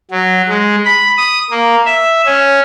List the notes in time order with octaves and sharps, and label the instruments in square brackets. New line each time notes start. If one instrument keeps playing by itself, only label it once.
[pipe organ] F#3
G#3
B5
D#6
A#3
E5
C#4